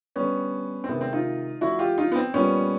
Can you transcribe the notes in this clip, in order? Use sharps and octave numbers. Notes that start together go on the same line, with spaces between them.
D3 G3 B3 C#4
C4
C3 D#3 G#3 B3
C4
D#4 F4
D3 F3 A3 E4 F#4
F4 G4
D#4 F4
B3
C4
A#2 G3 B3 C#4